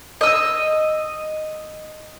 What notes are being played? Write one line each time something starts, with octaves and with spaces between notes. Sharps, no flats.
D#5 E6